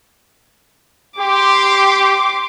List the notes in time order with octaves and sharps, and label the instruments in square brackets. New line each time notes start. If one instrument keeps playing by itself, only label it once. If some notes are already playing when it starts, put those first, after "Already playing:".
[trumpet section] G4 [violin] C6 D6